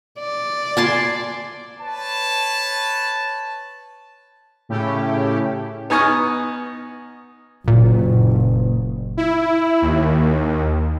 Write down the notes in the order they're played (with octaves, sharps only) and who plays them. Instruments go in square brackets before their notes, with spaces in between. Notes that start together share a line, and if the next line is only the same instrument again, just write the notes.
[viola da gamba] D5
[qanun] G#5 A5 C6
[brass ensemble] B4 C#5 A5
[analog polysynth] A2 C#3 A3 C#4 E4 G4
[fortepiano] B3 D#4 G#5 C#6 D#6 F6
[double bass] F#1 [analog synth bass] A#2
[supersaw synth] E4
D#2